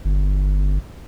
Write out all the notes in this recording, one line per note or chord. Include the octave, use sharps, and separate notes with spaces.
G1